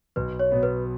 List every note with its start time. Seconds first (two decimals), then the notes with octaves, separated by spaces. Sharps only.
0.16 B1 B4
0.39 C#5
0.52 B2 F#3 B3
0.63 B4